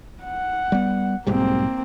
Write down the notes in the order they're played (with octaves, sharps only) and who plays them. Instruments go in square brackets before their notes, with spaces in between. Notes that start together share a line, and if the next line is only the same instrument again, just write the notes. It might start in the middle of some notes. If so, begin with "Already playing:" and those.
[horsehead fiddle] F#5
[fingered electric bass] G3 B3
[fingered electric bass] B1 G#2 G3 [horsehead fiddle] A#3 C4